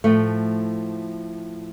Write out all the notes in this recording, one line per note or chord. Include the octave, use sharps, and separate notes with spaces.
A2 F3 A3